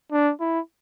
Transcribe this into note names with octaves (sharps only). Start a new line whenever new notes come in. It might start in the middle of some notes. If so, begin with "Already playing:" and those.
D4
E4